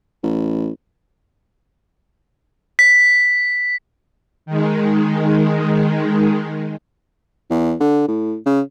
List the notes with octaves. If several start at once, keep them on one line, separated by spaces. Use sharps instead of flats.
A1
B6
D#3 G#3
E2
D3
A2
C#3